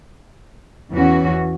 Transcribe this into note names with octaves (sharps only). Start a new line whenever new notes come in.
E2 E3 C#4 F#4